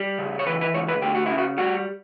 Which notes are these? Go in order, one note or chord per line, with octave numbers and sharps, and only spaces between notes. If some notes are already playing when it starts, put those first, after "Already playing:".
Already playing: G3
C#3
C#5
E3 B4
B4
C#2 C#5
B4
D2 G4
F#4
C#3 E4
F#4
G3 F#4